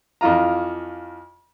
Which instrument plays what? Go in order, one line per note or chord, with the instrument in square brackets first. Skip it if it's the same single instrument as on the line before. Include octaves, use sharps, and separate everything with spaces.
[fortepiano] F2 E3 F4 A#5